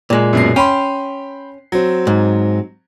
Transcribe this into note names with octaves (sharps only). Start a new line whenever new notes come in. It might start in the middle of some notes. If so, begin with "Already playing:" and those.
A#2 G#3
F#2 B2 C7
C#4 G5 B5 C6
F#3 C4
G#2